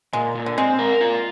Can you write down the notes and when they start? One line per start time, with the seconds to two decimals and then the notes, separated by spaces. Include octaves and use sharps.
0.13 A#2 G#3
0.35 A#2
0.46 D3
0.58 G#3 C4
0.79 A#4
1.01 F4